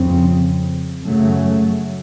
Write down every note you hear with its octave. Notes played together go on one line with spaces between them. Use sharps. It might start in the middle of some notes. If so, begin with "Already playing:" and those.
Already playing: F2 C#3 C4
F#2 C#3 F#3 A3